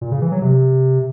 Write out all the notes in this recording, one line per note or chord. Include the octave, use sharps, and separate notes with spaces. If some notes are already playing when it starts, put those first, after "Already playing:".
A#2
C#3
E3
F#3
C3